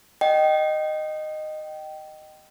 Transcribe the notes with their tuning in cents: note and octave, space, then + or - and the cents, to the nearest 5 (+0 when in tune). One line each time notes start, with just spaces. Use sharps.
D#5 -10 G5 -20